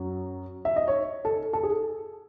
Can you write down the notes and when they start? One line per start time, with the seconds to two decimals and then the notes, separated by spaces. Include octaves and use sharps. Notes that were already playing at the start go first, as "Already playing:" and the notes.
Already playing: F#2 F#3
0.65 E5
0.76 D#5
0.88 C#5
1.25 A4
1.53 A4
1.63 G#4